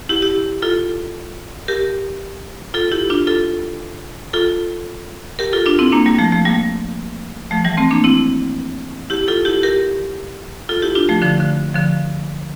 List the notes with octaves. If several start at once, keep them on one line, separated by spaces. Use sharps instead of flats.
E4 G4
E4 G4
F4 A4
G4 A#4
F4 A4
E4 G4
D4 F4
F4 A4
F4 A4
G4 A#4
F4 A4
D4 F4
C4 E4
A#3 D4
G3 A#3
F3 A3
F3 A3
G3 A#3
F3 A3
E3 G3
A3 C4
A#3 D4
C4 E4
E4 G4
F4 A4
E4 G4
G4 A#4
F4 A4
E4 G4
D4 F4
F3 A3
D3 F3
D3
D3 F3